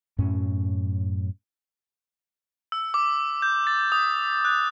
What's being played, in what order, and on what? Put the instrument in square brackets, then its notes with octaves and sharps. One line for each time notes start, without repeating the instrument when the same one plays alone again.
[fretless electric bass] F#2 A2 C#4
[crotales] E6
D6
G6
A6
D#6
F#6